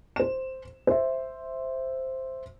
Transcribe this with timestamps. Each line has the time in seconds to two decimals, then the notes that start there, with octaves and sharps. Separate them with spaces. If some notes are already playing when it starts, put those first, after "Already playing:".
0.16 C5 E7
0.87 C5 E5